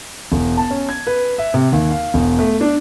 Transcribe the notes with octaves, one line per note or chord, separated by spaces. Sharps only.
E1
A5
C#4
G#6
B4
E5
C3
D#2
F5
E1
A3
D4